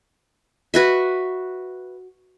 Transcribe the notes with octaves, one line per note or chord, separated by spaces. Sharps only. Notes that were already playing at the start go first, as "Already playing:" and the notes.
F#4 B4 E5